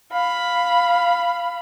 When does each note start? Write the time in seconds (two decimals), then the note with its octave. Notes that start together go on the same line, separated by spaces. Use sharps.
0.13 F5 B5